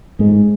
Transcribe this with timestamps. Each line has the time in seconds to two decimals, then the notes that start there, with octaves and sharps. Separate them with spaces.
0.19 G#2 G#3